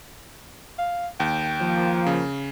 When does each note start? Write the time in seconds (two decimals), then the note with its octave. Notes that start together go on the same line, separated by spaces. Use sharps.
0.78 F5
1.20 D#2 G5
1.61 F3 A#3
2.06 C#3